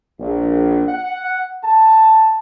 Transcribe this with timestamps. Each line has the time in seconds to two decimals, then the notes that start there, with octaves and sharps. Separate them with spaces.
0.20 A#1
0.88 F#5
1.63 A5